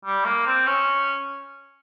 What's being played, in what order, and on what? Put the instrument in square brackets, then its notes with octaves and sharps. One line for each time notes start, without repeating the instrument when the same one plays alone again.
[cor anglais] G3
A#3
C4
C#4